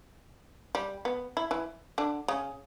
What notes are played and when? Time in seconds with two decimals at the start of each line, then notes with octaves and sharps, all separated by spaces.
0.75 G3
1.05 B3
1.37 E4
1.51 E3 E4
1.98 D3 D4
2.28 C#3 C#4